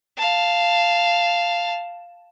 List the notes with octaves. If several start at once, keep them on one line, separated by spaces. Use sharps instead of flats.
F5 A5